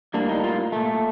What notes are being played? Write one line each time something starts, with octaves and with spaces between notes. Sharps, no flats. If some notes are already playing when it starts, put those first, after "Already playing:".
A2 G3 A#3 D4
D#4
F4
A#2 A3